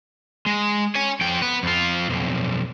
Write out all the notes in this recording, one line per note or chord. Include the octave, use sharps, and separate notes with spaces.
G#3
C#5 G#5
F2 G5
B3 B4
F2 F4
B1 F2